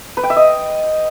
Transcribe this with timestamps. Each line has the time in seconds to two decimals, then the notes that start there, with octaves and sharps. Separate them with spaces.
0.17 B4
0.24 G5
0.30 E5
0.36 D#5